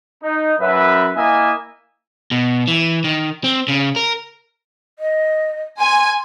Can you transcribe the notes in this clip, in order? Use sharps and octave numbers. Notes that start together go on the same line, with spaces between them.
D#4
F#2 B4 E5
A#3 E4 D#5 E5 G#5
B2
E3
D#3
C4
C#3
A#4
D#5
G#5 C6